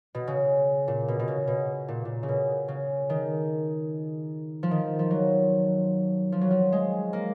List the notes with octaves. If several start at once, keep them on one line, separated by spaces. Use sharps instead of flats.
B2
C#3
A#2
B2
B2
C#3
B2
A#2
A#2
C#3
B2
C#3
D#3
F3
D#3
F3
F#3
F3
F#3
F3
G#3
A#3